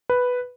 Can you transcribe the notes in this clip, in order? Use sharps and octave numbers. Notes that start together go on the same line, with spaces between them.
B4